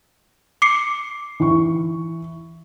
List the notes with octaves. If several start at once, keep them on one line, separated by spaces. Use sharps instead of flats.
D6 C7 C#7
E3 C#6